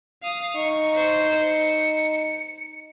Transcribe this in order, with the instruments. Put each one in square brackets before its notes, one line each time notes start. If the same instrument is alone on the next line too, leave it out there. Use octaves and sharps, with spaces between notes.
[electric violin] F5 D#6
[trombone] D#4 [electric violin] C#6
[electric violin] C5
C#7